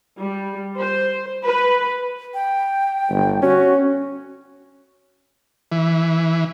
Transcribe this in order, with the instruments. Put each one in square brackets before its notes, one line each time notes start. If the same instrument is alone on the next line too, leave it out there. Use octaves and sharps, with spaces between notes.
[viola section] G3
C5
B4
[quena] G5
[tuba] G1
[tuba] C#4 [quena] F#4
[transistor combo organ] E3